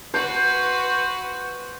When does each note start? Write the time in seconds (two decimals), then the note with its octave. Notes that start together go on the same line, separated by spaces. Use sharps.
0.14 F#4 B4 C5